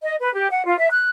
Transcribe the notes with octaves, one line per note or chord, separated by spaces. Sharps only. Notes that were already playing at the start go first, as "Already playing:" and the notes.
D#5
B4
G4
F#5
F4
E5
F#6